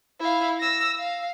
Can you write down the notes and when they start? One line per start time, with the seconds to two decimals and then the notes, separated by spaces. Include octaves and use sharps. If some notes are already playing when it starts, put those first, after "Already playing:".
0.20 E4 F5
0.60 E6 A#6
0.99 F5